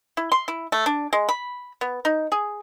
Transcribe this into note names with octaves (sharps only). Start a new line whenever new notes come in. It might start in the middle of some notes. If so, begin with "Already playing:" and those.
E4
C6
E4
A3
D4
G#3
B5
B3
D#4
G#4